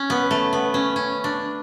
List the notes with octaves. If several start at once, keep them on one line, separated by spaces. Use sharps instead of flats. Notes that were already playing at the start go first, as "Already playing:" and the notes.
Already playing: C#4
B3
A3
B3
C#4
C#4
D4